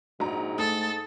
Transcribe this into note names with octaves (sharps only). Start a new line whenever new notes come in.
A#1 G#2 F#4 A#5
A3 A4 D#6 A6